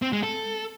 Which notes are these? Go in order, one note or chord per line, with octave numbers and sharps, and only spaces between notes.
C4
G#3
A4